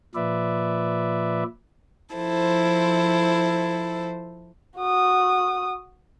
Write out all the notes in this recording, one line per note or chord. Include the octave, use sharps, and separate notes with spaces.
A#2 F3 B4 D5 E5
F3 E4 A4 C5
F#4 D#6